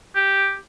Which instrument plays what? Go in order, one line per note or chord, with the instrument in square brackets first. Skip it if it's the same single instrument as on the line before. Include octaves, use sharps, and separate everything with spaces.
[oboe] G4